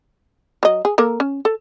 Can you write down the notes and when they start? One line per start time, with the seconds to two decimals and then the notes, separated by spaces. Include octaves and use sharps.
0.63 F#3 D#5
0.85 G#4
0.98 A#3 A4 A#4
1.20 C#4
1.45 A4